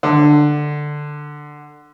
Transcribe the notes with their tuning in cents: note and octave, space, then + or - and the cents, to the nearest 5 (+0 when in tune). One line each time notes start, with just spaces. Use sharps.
D3 +10